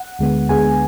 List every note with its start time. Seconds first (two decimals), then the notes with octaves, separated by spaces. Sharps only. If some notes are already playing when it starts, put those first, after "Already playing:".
Already playing: F#5
0.19 D2 D3 G#3 B3
0.49 D2 D3 G#3 B3 G#4 G#5